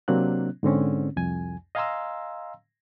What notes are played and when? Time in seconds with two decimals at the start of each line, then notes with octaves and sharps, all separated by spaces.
0.08 C3 F#3 A#3 C4 D4 F#6
0.63 G#2 D3 C4 C#4
1.16 C2 F2 G#5
1.75 D#5 F5 G#5 A#5 C6 E6